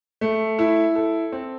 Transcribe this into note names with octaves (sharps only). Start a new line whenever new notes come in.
A3
E4
A4
C4